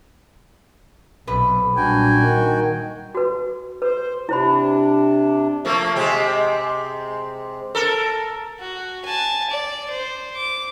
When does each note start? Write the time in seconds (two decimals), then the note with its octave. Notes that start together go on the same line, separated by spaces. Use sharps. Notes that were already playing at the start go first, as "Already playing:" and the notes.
1.27 B1 C3 B4
1.77 A#2 G3 D4 F#4 G5 G#5
2.21 D#3
3.15 F#4 B4
3.82 B4 C5
4.29 C3 D4 E4 C5 B5
5.65 F3 A3 A#3
5.96 C3 G#3 C4
7.75 A4 A#4
8.60 F#4
9.05 G#5 A5
9.50 D5
9.90 C5
10.36 D6